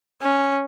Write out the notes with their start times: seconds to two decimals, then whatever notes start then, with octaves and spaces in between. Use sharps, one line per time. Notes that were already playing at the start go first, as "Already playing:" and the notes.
0.22 C#4